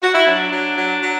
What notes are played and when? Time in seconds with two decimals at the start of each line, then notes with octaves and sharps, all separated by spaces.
0.02 F#4
0.14 E4
0.27 F#3 D4
0.52 F#3
0.78 F#3
1.03 F#3